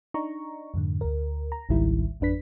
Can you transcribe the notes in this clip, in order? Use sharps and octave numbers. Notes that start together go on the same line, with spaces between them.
D4 D#4 A#5 C#6
F2 G#2 D3
D2 A#4
A#5
G#1 C#2 G#2 D#3 G3 E4
G#1 F2 D4 B4 B6